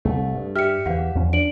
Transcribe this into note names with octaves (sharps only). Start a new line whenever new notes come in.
C2 A3
G2
G4 E5 F6 C#7
E2 E3 F5 F#5
E2 F3 C#4
D4 D7 F#7